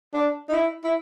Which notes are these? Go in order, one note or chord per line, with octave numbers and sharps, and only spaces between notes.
D4
D#4
E4
E4